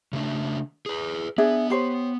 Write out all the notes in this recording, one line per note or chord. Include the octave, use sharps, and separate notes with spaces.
C#3 A3 D4
G#4 B4
B3 D4 G#4 E5
G4 C5 C#5